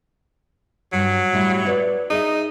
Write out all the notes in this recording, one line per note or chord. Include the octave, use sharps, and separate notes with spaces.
G2 F#3
A2 G3 E4
E4 B4 D5
D#4 G#4 A#4 E5